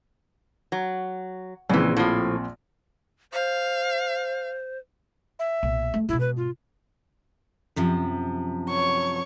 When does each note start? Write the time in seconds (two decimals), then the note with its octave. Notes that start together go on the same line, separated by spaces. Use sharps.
0.72 F#3
1.70 A#1 C#3 E3 C4
1.97 A2 F3
3.33 C5 F5
5.39 E5
5.63 B1 A#2
5.94 A3
6.09 G#2 B2 E4
6.20 B4
6.37 F4
7.76 F#2 C3 F3
8.69 C#5 C#6